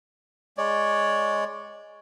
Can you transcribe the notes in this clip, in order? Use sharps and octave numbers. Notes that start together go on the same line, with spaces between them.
G#3 C#5 D5